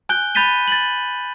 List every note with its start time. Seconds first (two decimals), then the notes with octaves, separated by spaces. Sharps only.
0.09 G#5 F#6 G6 G7
0.35 B5 G6 A6 B6 D#7 G7
0.68 A6 F#7